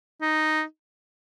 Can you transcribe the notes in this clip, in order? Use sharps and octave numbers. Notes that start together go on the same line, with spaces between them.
D#4